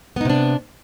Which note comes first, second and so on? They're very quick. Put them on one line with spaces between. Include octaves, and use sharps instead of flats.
B3 D#4 C3 D4